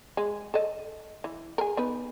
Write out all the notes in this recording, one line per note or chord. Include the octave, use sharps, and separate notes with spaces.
G#3
A4 D#5
E3
G#4 A#4
B3 D#4 B4